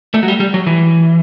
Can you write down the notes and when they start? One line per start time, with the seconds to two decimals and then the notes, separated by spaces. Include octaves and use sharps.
0.14 A3
0.23 F#3
0.28 G3
0.40 G3
0.54 F#3
0.67 E3